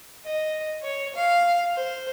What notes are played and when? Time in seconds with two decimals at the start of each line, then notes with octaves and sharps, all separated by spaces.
0.25 D#5
0.82 C#5
1.15 F5
1.75 C5